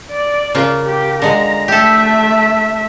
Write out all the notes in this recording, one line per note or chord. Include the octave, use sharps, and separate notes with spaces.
D5
C#3 A#3 F4
G4
D3 G#3 A#5
A3 G4 A4 E5